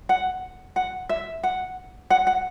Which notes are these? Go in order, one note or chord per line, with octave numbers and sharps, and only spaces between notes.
F#5
F#5
E5
F#5
F#5
F#5